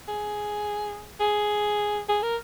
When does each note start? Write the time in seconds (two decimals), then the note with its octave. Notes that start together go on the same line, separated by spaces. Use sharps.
0.08 G#4
1.20 G#4
2.08 G#4
2.23 A#4